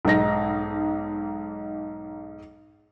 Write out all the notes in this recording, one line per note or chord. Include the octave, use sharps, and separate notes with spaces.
B1 G#2 D#4 A#6